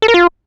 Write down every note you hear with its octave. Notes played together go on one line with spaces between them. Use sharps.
A4
A#4
F4